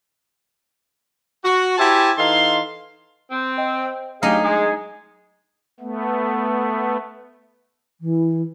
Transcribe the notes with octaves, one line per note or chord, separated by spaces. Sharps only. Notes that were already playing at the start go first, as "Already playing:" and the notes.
F#4
E4 G4 C5 E5 G#5 A5
E3 D#4 A4 F5 C6
C4
C5 D#5 G5
F#2 F#3 A3 D4 D#4 G4 G#4 F5
G#3 G#4
A3 B3
E3